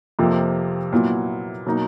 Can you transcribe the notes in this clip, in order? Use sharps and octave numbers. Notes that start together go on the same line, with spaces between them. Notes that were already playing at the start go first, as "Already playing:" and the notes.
F2 C3 F3 A#3
A#2 F#3 B3 E4
B2 F#3 A#3 D#4